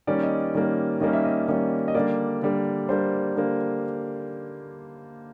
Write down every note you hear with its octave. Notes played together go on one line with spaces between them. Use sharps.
D#3 G3 A#3 C#4 D5
D#5
D#3 G3 A#3 C#4
D#3 G3 A#3 C#4 D#5
E5
D#5
D#3 G3 A#3 C#4
D#5
D3 G3 A#3 D5
D3 G3 A#3
D3 G3 A#3 C5
D3 G3 A#3